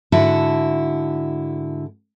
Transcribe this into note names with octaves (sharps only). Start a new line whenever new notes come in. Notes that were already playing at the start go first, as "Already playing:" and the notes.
G#2 D3 E4 F#4 A5